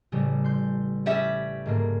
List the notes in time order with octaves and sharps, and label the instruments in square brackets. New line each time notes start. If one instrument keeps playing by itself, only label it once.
[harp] A1 C#3 G3
C6 G6
[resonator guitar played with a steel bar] G3 C#4 E5
[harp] G#2 D3 A#3